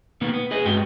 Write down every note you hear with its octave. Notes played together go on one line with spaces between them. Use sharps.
B2 D#3 A#3 B3
B3
G#4 B4 D#5
G2 G#3 F#4 D#5 G5